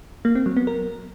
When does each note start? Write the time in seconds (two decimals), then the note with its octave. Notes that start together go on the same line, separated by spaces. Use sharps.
0.25 A#3
0.35 C4
0.46 F#3
0.57 B3
0.67 A#4